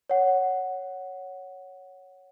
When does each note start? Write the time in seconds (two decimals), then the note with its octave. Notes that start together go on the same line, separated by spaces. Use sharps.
0.10 C#5 F#5